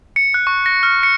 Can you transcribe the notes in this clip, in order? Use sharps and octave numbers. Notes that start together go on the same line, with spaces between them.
C#7
F#6
C#6
A#6
F6
C#7